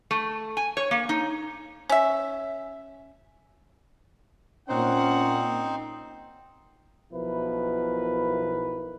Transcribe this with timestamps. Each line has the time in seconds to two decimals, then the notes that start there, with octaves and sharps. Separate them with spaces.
0.11 A3
0.57 G#5
0.77 C#5
0.91 A#3
1.09 D#4
1.89 C#4 E5
4.69 A#2 C4 C#4 D#4 C5 F#5
7.12 B1 B2 F3 E4 A#4 B4